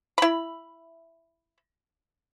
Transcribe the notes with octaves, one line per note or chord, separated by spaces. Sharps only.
E4 B5